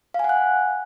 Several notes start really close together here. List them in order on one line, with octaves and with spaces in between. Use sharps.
F5 G#5 F#5 F#6